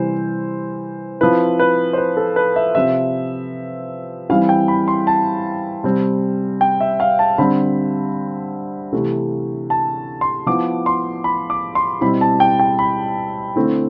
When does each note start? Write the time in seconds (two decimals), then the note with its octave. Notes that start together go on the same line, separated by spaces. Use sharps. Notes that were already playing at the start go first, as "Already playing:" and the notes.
Already playing: C3 E3 G3 C5
1.21 F3 C4 E4 B4
1.60 B4
1.93 C5
1.98 B4
2.17 A4
2.36 B4
2.56 E5
2.75 C3 F3 C4 E5
4.30 E3 G3 C4 E4 F5
4.49 G5
4.68 B5
4.88 C6
5.07 A5
5.83 C3 G3 C4
6.61 G5
6.80 E5
7.00 F5
7.19 A5
7.38 D3 G3 C4 B5
8.93 C3 E3 A3
9.70 A5
10.21 C6
10.47 F3 B3 E4 D6
10.86 C6
11.24 B5
11.50 D6
11.75 C6
12.01 B2 G3 C4 E4 B5
12.21 A5
12.40 G5
12.60 G5
12.79 B5
13.56 D3 A3 C4 E4